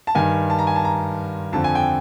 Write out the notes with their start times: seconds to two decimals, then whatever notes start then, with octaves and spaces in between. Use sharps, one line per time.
0.07 A5
0.15 G2 D#3 G#5
0.50 A5
0.59 A#5
0.67 G#5
0.76 A5
0.84 A#5
1.53 F2 D3 F3 A5
1.64 G#5
1.75 G5